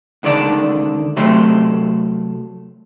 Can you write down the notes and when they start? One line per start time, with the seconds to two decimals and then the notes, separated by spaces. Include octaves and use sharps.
0.23 C#2 D3 D#3 D5 A5
1.16 C3 F#3 A3 A4 C6